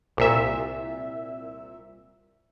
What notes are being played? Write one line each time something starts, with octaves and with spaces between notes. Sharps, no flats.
C2 A#2 E5